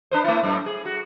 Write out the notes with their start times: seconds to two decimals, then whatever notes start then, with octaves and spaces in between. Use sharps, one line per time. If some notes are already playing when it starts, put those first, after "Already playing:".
0.11 D4 B4 C5
0.24 A3 E4
0.43 F#2 A2
0.66 G#4
0.86 F#4